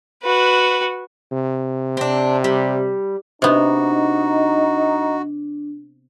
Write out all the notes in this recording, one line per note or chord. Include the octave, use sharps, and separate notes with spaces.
F#4 B4
C3
C4 D4
G3
C3 B3 D4 D#4 F#4